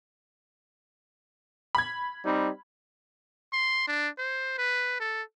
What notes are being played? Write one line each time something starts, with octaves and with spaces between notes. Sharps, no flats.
B5 G#6
G3 C4 D#4
C6
D4
C5
B4
A4